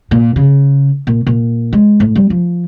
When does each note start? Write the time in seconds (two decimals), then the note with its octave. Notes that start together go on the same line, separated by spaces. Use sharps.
0.11 A#2
0.36 C#3
1.07 A#2
1.27 A#2
1.73 G#3
2.00 A2
2.15 G3
2.30 F3